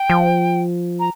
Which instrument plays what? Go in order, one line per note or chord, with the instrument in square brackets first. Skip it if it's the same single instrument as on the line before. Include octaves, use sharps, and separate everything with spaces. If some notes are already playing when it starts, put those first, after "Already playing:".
Already playing: [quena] G5
[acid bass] F3
[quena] A#5